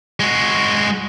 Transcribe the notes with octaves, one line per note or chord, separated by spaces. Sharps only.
G#3 F#4